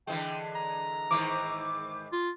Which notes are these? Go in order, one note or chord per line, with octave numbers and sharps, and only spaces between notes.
D3 E3 G#3 G5
A#5
G#2 D#3 E3 D6
F4